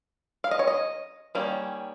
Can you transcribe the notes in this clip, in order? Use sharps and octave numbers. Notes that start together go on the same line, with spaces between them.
F5
D#5
C#5
D#5
D#3 G3 A#3 C#4